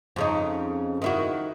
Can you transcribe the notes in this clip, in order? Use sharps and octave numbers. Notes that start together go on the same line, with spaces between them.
F2 C#3 D#4
D#3 E4 F#4